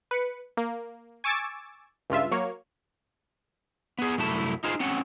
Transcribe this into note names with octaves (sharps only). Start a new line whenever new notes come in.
B4 C#7
A#3
G#5 C#6 D6 E6 G#6 A6
C#2 G2 F4 E5
F#3 A#3 C#5
B3 G#4
C2 F#2 A3 E4 A5
D#4 F4 G#4 C5
C4 C#4 F#5